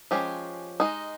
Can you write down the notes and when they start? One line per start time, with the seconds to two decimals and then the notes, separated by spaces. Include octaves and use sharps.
0.11 F3 G#3 C#4 G4
0.80 G#3 D#4